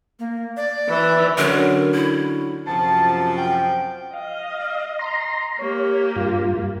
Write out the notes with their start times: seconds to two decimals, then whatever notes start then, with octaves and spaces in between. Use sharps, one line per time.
0.19 A#3
0.57 D5
0.89 E3
1.38 D3 F#3 C#4 A#4
1.94 E4
2.67 F#2 C3 F3 A5
3.37 G5
4.14 D#5 F5
4.99 A#5 C6
5.59 A#3 G4 C#5
6.16 G2 F4